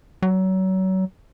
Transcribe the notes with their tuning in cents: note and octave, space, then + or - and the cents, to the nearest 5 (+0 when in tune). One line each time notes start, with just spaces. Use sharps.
F#3 +30